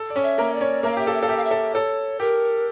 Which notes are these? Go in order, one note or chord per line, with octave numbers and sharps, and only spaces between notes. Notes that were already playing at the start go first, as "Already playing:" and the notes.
Already playing: A4
D5
C#4 C#5
E5
A#3 A#4
D5
C#4 C#5
A#3 A#4 E5
F5
G4 E5
A4 F5
E5
A4 F5
G4 E5
F5
E5
A4
A4 C#5
G4 A#4